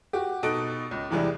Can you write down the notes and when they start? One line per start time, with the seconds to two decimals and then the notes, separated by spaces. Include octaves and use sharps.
0.13 F#4 G4
0.43 B2 D#4 A4 D#5 F#6 D7
0.91 C#2
1.11 E2 C3 E3 G3 G#3 D4